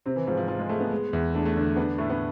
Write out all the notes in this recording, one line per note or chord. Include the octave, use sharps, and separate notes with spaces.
C3 C4
E3
G#2 F3
F3
F3 F4
G#3
G#3 A3
B3
G#3
E2
A3 D4
A3
D3
B3 D4
A2 A3
B3